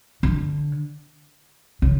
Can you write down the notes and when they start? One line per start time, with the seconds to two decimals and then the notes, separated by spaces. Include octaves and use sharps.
0.23 D3
1.82 C#3